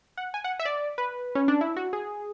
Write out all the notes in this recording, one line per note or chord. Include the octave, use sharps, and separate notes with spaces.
F#5
G#5
F#5
E5
D5
B4
C#4
D4
E4
F#4
G#4